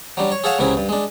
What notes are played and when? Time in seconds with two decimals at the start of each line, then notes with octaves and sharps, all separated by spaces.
0.17 F#3 G3 D4
0.32 C#5
0.44 G#4 A4 C#5 F5 F#5 A5
0.59 C#2 C3 F#3 E4 G#4
0.77 G2
0.89 G#3 D4